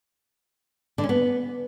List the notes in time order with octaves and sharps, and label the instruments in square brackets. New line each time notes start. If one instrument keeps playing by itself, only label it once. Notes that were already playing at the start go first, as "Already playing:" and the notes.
[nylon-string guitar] D3
C#4
B3